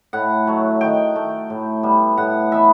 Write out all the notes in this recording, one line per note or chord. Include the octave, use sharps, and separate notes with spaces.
A2 F#5
F#3 A3
D#3 G5
A3
A2
G3 B3
A2 F#5
E3 B3 E5